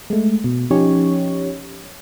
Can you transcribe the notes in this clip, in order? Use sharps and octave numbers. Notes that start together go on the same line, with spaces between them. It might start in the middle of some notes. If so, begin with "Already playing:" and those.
G#3 A3
B2
F3 C#4 D#4 G4 C#5